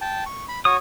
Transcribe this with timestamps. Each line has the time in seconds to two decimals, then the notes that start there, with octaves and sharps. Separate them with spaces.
0.01 G5 A5
0.26 C#6
0.48 B5
0.65 F#4 C#5 D#6